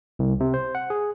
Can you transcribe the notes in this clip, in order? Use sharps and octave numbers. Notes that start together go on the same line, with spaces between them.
C2
C3
C5
F#5
G#4